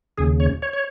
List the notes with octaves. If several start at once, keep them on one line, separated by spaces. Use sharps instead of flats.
D#2 C#3 G#4
C#5
C#5
C#5